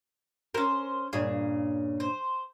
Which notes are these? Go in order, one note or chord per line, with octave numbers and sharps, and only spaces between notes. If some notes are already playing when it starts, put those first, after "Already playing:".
C#4 A#4 C5
G2 A#2 C#3 G#4
C5